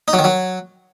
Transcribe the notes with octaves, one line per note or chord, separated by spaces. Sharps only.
D#4
F#3
D#3
F#3